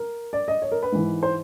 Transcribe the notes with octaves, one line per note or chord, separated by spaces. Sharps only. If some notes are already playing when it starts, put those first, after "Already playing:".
Already playing: A#4
D5
D#5
C#5
A#4
B4
G#2 E3
C5